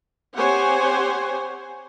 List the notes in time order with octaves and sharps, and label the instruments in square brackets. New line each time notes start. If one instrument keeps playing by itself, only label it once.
[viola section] C4 G4 C5 C#5 F#5 G#5